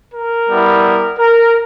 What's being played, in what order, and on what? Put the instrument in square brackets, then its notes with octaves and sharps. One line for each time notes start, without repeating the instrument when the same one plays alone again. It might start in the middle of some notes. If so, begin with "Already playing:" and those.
[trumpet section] A#4
G3 B3 E4
A#4